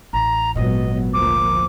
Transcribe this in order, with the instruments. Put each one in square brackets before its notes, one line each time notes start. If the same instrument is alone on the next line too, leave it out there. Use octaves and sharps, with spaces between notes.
[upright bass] A1 [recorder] A#5
[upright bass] G#1 A#2 [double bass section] F#3 B3 [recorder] D#5
[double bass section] D2 F3 A#3 [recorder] D6